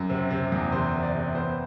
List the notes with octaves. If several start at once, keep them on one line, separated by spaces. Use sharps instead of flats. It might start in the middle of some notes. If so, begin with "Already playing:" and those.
Already playing: F#2
C3
C3
E2
C3 C5
C3
D5
C3
B3 C5